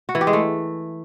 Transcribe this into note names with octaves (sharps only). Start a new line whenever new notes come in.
F#4
E3
G4
G#3
A3